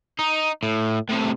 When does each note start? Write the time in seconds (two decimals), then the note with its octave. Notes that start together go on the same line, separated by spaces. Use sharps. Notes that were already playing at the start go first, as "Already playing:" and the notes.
0.19 D#4
0.63 A2
1.09 A2 C3